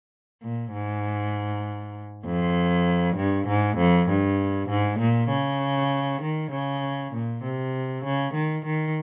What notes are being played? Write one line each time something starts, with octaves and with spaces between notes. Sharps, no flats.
A#2
G#2
F2
G2
G#2
F2
G2
G#2
A#2
C#3
D#3
C#3
A#2
C3
C#3
D#3
D#3